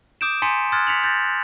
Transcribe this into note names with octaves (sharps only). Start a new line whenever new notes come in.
D6 D#6 G6 D7 E7
G#5 A#5 C6 A6 B6 C#7
C6 D#6 F6 F#6 G#6 A6
B6 C#7 F7 F#7
G6 A6 A#6